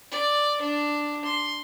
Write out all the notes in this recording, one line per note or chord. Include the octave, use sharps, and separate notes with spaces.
D5
D4
C6